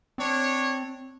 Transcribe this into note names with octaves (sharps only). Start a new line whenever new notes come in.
C4 D4 C#5